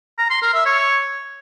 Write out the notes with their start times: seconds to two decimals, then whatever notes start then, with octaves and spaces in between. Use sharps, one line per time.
0.18 A#5
0.30 C6
0.42 A#4
0.54 E5
0.66 C#5